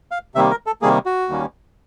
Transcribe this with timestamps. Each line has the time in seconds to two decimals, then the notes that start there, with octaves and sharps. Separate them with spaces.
0.11 F5
0.35 C3 D#3 G3 A#3 E5
0.51 A#4
0.67 A4
0.82 C3 D#3 G3 A#3 G#4
1.06 F#4
1.29 D#2 D#3 G3 A#3 C#4